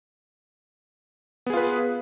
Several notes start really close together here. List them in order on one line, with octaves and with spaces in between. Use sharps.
B3 G#4 F4 B4